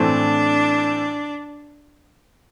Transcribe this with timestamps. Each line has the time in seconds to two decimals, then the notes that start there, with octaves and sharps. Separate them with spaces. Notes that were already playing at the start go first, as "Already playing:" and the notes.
Already playing: A2 E3 A3 C4 D4